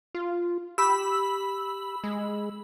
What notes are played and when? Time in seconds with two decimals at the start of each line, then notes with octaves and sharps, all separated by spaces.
0.15 F4
0.78 G4 B5 E6
2.04 G#3